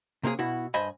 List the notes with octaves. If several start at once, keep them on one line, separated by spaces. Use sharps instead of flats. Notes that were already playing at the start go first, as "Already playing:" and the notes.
C3 A#3 C#4 G#4
B2 E4 F#4
G2 C5 D#5 G#5 B5